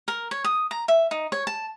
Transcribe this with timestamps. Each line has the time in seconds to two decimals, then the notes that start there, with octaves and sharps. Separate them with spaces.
0.08 A#4
0.31 C#5
0.44 D#6
0.71 A#5
0.88 E5
1.11 D#4
1.32 C#5
1.47 A5